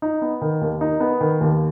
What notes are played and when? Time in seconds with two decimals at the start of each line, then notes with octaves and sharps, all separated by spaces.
0.02 D#4
0.22 B3
0.41 D#3
0.61 D#2
0.81 D#4
1.00 B3
1.21 D#3
1.41 D#2